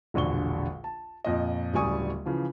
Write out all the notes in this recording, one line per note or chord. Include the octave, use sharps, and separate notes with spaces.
E1 A#1 D3 C#6 G7
A5
F2 A#2 D#5
D1 C#3 G3 G#5 C#6 D#6
C#3 E3 F3